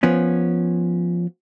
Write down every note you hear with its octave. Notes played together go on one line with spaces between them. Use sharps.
F3 B3 C#4